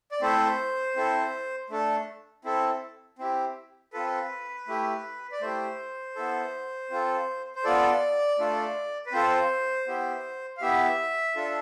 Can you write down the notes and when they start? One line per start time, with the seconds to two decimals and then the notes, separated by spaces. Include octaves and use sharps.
0.12 D5
0.21 A3 C4 E4 A4 C5
0.96 C4 E4 A4
1.70 A3 D4 A4
2.45 C4 E4 A4
3.19 C4 E4 G4
3.93 C4 F4 A4 B4
4.68 A3 E4 G4
5.32 D5
5.41 A3 E4 G4 C5
6.15 B3 E4 A4
6.91 C4 F4 A4
7.55 C5
7.64 B3 F4 A4 D5
8.39 A3 D4 F4 A4
9.06 B4
9.12 C4 F4 A4 C5
9.87 B3 E4 G4
10.57 F5
10.61 B3 E4 G4 E5
11.36 D4 F4 A4